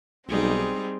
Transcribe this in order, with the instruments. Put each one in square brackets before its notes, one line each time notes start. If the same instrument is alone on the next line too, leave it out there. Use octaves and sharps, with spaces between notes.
[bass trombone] B1 [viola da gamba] G3 D#4 [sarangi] C4 [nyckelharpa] G#4